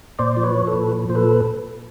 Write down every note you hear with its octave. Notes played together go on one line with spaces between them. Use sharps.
A#2 C5 D5
F3
B4 C#5
F3
A4 B4
A#2
F3
A#2 C5
A4 B4